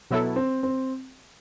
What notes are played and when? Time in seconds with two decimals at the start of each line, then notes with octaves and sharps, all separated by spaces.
0.11 B2 F#3 B3 E4 A4
0.36 C4
0.63 C4